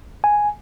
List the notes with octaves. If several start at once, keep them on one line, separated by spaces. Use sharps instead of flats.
G#5